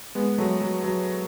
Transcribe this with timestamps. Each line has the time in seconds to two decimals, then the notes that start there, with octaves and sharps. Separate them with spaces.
0.15 G#3 B3
0.38 F#3 A3
0.61 F#3
0.84 F#3